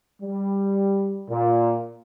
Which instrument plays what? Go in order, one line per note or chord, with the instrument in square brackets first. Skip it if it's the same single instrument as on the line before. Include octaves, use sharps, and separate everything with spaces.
[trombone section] G3
A#2